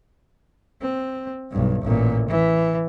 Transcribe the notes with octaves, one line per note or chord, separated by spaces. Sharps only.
C4
B1 G2
A1 A#2
E3